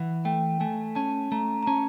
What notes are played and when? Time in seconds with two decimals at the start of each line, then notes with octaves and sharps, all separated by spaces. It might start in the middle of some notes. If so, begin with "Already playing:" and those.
Already playing: E3 F#5
0.25 A3 G5
0.60 A3 G#5
0.95 C#4 A5
1.32 A3 A#5
1.63 A#5
1.66 C#4 A5